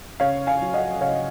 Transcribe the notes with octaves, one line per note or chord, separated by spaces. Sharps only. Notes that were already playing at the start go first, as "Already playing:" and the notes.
C#3 C#5 F5
F5 G#5
F#3
D#5 F#5
C#3 C#5 F5